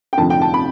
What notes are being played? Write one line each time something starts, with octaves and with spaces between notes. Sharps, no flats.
G5
F1 F2 D3 F3 A5
G5
A5
B5